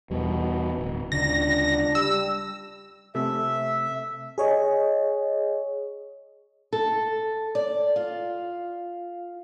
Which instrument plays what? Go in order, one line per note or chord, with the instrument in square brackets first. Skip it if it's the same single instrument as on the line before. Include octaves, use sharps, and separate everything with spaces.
[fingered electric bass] E2 G3 [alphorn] B2
[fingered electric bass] D1
[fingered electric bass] D2 C#3 [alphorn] D4 [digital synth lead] A#6
[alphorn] G3 [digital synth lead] E6
[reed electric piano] C3 A3 [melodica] E5
[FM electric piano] G#4 C#5 D#5
[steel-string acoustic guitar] A4
D5
F4